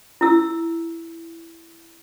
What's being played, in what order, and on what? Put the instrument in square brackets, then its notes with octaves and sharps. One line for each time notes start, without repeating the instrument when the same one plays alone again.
[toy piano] E4 E6